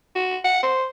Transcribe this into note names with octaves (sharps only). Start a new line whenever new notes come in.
F#4
F#5
C5